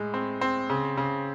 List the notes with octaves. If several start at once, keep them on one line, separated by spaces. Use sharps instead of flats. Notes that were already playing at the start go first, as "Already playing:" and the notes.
Already playing: A2 G#3
C4
C4
C#3
C#3